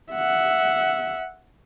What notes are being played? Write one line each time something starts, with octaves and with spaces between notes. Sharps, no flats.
E5 F#5